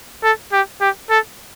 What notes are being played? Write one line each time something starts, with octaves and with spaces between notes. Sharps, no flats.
A4
G4
G4
A4